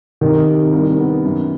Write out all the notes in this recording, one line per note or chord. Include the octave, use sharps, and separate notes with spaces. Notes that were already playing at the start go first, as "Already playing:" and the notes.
C3 D#3
C3
C2
B3
F#2